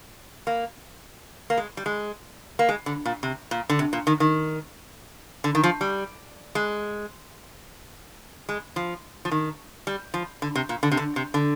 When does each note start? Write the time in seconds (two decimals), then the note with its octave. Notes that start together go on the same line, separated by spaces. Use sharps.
0.47 A#3
1.50 A#3
1.57 G#3
1.77 G3
1.86 G#3
2.59 A#3
2.69 G#3
2.86 D3
3.06 A#2
3.23 C3
3.51 A#2
3.70 D3
3.79 C3
3.93 A#2
4.07 D#3
4.20 D#3
5.44 D3
5.55 D#3
5.64 F3
5.81 G3
6.55 G#3
8.49 G#3
8.76 F3
9.25 F3
9.31 D#3
9.87 G3
10.14 F3
10.42 D3
10.56 C3
10.69 A#2
10.83 D3
10.92 C3
10.97 D3
11.16 C3
11.34 D3